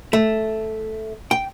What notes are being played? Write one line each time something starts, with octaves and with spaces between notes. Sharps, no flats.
A3
G5